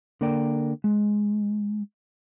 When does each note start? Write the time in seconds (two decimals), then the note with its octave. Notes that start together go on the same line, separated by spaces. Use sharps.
0.21 D3 A#3 A#4 D5 G5
0.84 G#3